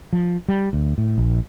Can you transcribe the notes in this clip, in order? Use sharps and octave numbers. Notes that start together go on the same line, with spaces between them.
F3
G3
D2
A2
A#1